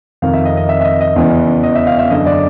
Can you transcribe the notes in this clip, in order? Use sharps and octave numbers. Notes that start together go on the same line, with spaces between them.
F2 C3 D#3 F5
E5
D#5
D#5
E5
E5
D#5
D#5
E2 C#3 E3
D#5
E5
F5
E5
F#2 D3 D#5
D5